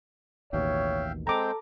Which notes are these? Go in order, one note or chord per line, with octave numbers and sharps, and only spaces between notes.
A1 D#2 B2 C#5 E5 F5 G5
G#3 C4 A4 G5 A#5 D6